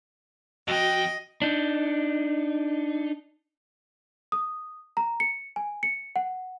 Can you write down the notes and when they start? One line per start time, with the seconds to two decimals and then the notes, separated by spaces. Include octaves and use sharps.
0.68 F2 F#4 D#5 G5
1.42 D4 D#4
4.32 D#6
4.97 A#5
5.20 C#7
5.56 G#5
5.83 C#7
6.16 F#5